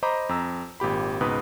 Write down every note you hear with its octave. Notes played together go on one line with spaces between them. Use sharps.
C5 D#5 A#5 B5 D6
F2 A#5 E6
G#1 A#2 G4 B5
C#2 G#2 B2 B4 D#6